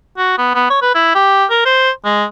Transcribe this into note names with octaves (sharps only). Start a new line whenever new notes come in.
F#4
B3
B3
C#5
B4
E4
G4
A#4
C5
G#3